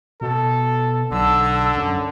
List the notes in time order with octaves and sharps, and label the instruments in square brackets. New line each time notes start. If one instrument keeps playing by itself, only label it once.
[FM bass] B2 [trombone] A4
[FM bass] B1 [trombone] D3 [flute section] A5 E6
[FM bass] F#2